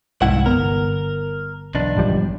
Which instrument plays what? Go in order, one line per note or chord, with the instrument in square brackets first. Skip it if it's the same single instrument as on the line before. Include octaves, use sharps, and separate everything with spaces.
[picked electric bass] C2 G#2 [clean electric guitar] F2 E4 F#5
[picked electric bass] G1 B3 [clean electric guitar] A#4
[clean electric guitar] B1 E2 D4
[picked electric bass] G#1 F3 G3